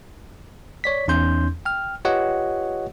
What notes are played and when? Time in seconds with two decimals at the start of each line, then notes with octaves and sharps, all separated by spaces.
0.84 C#5 D5 B6
1.08 E2 C#4 D#4 C6 G6
1.65 G5 F6
2.05 F4 G4 B4 C#5 D#5 F#5